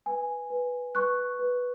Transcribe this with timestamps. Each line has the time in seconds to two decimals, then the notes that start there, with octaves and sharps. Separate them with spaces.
0.06 B4 G#5
0.50 B4
0.95 B4 C#6 F#6
1.39 B4